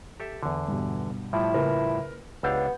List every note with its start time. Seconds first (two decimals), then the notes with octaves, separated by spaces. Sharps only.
0.20 G4 A4 E5
0.43 E2 D3
0.68 G2 B2
1.33 A2 F3 G3 E4
1.53 F#1 A#4 B4
2.43 C#2 B3 D4 G4 F5 E6 G6